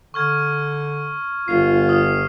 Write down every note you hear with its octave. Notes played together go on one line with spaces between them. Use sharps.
D3 C#6 F6 G#6
G1 F4 C7
D#6 F6